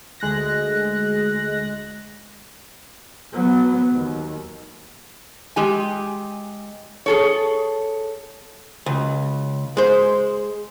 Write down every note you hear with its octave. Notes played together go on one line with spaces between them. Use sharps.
D2 G#3 F#6 A#6
F#3 B3
D#2
G#3 G4 G#5
G#4 A4 C#5
C#2
G#3 C5